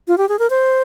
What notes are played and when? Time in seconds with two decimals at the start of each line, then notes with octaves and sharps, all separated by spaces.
0.08 F4
0.18 G4
0.29 G#4
0.39 A#4
0.50 C5